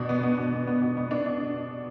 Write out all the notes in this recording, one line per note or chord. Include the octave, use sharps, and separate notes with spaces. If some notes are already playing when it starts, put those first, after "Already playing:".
Already playing: B2 D4
B3
B3
B2
B3
B3
B2
B3
D4
D4